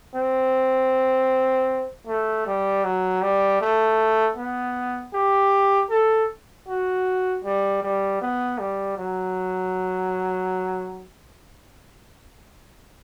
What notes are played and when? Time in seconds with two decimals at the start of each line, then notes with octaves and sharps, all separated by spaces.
0.15 C4
2.07 A3
2.46 G3
2.84 F#3
3.22 G3
3.61 A3
4.37 B3
5.14 G4
5.91 A4
6.68 F#4
7.44 G3
7.83 G3
8.21 B3
8.59 G3
8.98 F#3